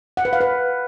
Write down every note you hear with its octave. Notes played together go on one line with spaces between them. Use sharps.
F#5
B4
F5
B4